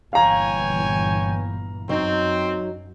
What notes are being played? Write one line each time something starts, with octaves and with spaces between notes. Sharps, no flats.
G1 A#2 E3 C#5 F5 G5 G#5 A#5
F#2 F#3 C4 D#4